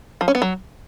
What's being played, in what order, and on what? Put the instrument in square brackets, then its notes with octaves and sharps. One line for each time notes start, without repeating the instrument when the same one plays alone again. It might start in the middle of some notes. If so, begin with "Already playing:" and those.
[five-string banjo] F3
C#4
B3
F#3